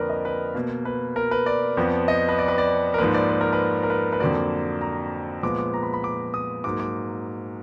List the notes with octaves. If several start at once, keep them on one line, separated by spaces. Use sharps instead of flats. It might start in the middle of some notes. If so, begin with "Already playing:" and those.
Already playing: F2 D3 F3 A#3 A#4 B4 D5
D#5
B4
B2 A#3
B4
A#4
B4
D5
F2 F3 B3
D#5
B4
D5
B4
D5
A#4
G#2 F3 A#3 B4
D5
B4
A#4
B4
A#4
B4
B4
F2 D3 F#3 A#3 D5
A#5
A#2 F3 G#3 B3 D6
D6
A#5
B5
B5
D6
D#6
G#2 F#3 A#3 D6
D6